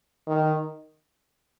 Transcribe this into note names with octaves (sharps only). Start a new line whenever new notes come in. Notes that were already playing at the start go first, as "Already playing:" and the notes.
D#3